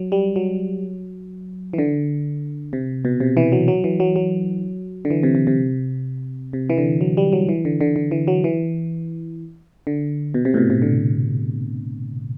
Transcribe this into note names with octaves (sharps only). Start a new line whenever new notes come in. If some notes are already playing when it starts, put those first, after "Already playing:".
Already playing: F#3
G3
F#3
E3
D3
C3
B2
C3
E3
F#3
F#3
E3
F#3
F#3
D3
E3
C3
C3
C3
C3
E3
D3
F#3
G3
F#3
E3
D3
D3
D3
E3
F#3
E3
D3
B2
C3
A2
B2
C3
D3